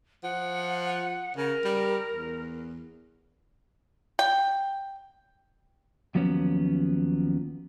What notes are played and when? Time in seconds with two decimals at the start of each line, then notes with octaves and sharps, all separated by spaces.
0.23 F3 F#5
1.37 C#3 A#4
1.65 G3
2.12 E2
4.19 G5
6.15 D#2 F3 F#3 B3 C#4